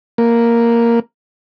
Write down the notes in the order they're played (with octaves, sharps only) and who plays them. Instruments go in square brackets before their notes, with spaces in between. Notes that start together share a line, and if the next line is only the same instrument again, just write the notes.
[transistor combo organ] A#3